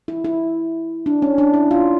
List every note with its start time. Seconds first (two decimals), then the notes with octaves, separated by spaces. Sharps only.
0.08 E4
0.24 E4
1.06 D4
1.22 C#4
1.38 D4
1.54 E4
1.71 F4